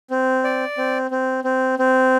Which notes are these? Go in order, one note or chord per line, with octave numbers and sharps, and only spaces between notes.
C4
D5
C4
C4
C4
C4